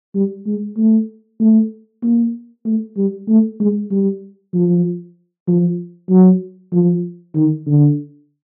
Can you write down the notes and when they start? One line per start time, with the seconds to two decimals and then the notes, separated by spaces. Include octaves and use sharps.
0.15 G3
0.46 G#3
0.77 A3
1.40 A3
2.03 A#3
2.65 A3
2.97 G3
3.28 A3
3.60 G#3
3.91 G3
4.54 F3
5.48 F3
6.10 F#3
6.72 F3
7.35 D#3
7.66 D3